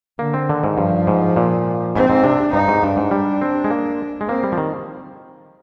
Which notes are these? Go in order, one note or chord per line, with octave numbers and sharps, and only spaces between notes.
D3 A#3
C4
D3 D#3
G#2
G2 F3
G#2
A#2
G#2 C4
G#2
C3 D4
G2 D#4
G#2
G2 D4
G#2
G3
C4
G#3
A#3
G#3
A#3 C4
G3
F3
D#3